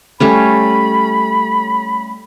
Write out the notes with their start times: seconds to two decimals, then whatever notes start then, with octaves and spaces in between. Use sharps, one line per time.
0.20 G3 A3 C#4 B5